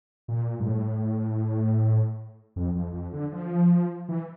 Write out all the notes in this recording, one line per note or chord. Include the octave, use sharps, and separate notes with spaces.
A#2
G2
A2
F2
F2
F2
D3
F3
E3